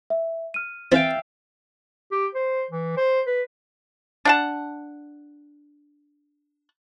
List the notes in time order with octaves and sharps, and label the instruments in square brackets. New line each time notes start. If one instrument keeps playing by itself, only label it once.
[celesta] E5
F6 D#7
[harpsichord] E3 C4 [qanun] E5 F5 G5 [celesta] A6
[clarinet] G4
C5
E3
C5
B4
[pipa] D4 F#5 A5